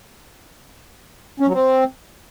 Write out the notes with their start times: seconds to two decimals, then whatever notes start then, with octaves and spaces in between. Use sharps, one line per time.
1.40 C#4
1.47 F#3
1.54 C4